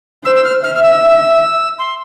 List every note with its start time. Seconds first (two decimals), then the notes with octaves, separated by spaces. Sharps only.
0.25 C5 E6
0.35 E6
0.44 F6
0.63 E5 F6
0.75 F6
0.82 E6
1.78 C6